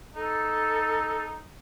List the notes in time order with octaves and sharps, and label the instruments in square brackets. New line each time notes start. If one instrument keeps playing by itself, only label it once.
[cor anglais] D#4 [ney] A4